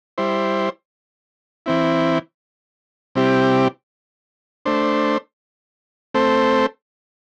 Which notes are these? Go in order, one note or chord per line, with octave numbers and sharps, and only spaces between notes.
G3 E4 C5
E3 C4 E4
C3 G3 C4 E4 G4
A3 D4 C5
A3 C4 A4 C5